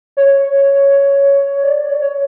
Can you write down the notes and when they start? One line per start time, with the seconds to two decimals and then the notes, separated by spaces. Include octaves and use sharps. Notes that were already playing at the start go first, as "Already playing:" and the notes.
0.17 C#5
1.64 D5
1.89 C#5
2.01 C#5